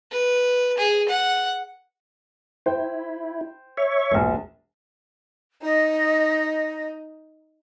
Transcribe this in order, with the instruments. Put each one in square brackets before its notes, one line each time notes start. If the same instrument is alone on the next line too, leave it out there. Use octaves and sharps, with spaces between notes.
[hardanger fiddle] B4
G#4
F#5
[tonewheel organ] E4 [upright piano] C5 G5
[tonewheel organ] C#5 E5 C#6
[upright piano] E1 A#1
[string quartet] D#4 [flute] D#5